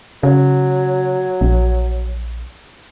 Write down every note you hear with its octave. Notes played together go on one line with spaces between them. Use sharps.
C#3 F#3
A#1